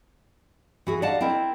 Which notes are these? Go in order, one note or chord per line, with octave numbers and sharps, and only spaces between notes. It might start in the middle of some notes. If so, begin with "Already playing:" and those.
E3 F#4 G#4
D5 D#5 F5 F#5 A5
C4 E4 A#4